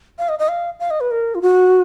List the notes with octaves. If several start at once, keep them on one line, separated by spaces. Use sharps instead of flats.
F5
D#5
D#5
F5
F5
D#5
B4
A#4
F4
F#4